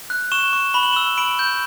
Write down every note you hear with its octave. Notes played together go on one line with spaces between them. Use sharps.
F#6
C#6 E7 G7
C#6
B5 G7
F#7
E7 G7
E6
B5 D7 F#7
G6